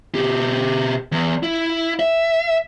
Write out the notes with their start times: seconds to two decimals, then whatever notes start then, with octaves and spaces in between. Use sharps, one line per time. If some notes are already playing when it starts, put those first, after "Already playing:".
0.15 B2 G4
1.12 E2
1.43 E4
1.99 E5